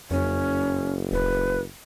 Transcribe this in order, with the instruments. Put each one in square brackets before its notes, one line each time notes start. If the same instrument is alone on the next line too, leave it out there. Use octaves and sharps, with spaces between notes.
[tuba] F#1 [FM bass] F2 [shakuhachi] C#4
[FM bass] D#1 [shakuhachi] B4